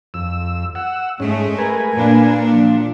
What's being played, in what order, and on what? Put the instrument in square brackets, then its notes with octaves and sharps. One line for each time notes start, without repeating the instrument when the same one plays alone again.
[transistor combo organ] F2 E6
F#5 E6
[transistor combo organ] G#2 C#4 [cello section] G#3 A3
[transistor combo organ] A#4 B4 G#5
[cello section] A#2 D4
[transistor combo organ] F3